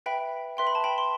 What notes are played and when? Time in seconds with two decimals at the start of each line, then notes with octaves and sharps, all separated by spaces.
0.06 B4 E5 G5 B5
0.57 B4 E5 G5 C6
0.67 B5
0.75 A5
0.84 G5 B5
0.98 C6